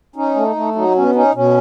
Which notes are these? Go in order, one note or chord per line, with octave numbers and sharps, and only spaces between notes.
C#4 D#4
A3
A3
F#3 D#4
B2 C#4
C#4 D#4
B2 C#4